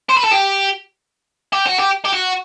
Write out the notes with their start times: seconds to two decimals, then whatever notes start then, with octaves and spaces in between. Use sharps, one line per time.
0.09 C5
0.17 B4
0.24 A4
0.31 G4
1.53 G4
1.67 F#4
1.79 G4
2.05 G4
2.13 F#4